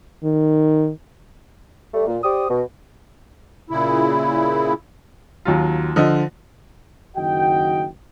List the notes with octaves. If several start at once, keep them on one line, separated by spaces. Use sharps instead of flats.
D#3
G3 A3
A#2
G4 C5 D5 D#6
B2
A#2 C#3 E4
D#2 F#3 F4
D3 F3 D#5
F#1 D#3 F#4 D#5 G5